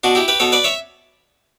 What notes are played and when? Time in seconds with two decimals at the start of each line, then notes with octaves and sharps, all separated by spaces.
0.04 B2 D4 F#4
0.15 E4 G4
0.28 G4 B4
0.40 B2 A4 C#5
0.52 B4 D5
0.64 C#5 E5